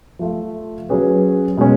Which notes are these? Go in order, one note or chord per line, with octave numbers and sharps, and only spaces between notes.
F3 A3 F4
F#3 C#4 G#4 B4
B2 G#3 C#4